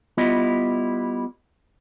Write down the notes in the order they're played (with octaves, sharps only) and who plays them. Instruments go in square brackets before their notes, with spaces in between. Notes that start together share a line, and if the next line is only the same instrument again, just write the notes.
[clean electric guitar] G3 B3 E4 F4 D#5